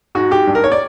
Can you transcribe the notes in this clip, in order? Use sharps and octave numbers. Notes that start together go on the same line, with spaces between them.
G#2 F#4
G#2 G4
G2
A#4
C#5
D5